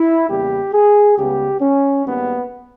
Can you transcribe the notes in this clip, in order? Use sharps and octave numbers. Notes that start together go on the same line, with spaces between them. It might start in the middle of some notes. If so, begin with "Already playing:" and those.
Already playing: E4
E2 C#3 G3 A#3 G4
G#4
C#2 C#3 G3 B3 G4
C#4
G#1 G#2 G3 A#3 B3